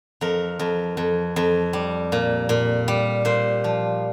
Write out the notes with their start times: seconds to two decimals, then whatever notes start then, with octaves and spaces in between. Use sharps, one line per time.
0.21 F2 A#4
0.59 F2
0.97 F2
1.36 F2
1.73 G3
2.12 A#2
2.49 A#2
2.88 G3
3.25 A#2 C5
3.64 F3